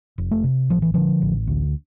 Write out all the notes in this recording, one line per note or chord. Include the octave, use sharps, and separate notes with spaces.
F1
A3
C3
A1 F3
E3
D3 F3
A1
D2